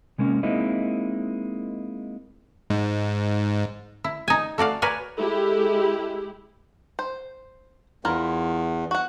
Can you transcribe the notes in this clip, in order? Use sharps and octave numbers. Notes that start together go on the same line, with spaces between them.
C3 G#3 A#3 C#4
G#3 A#3 C4 D#4 E4
G#2
E4
D#4 G#5
A3 F#4 D5 F5
A#4 B4 C#5 D5 G#5
G#3 E4 G4 A4
C5
E2 E4 F4 A#4
F#4 F#5